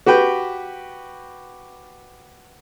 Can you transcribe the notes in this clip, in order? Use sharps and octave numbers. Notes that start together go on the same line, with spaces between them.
F#4 G4 B4 G5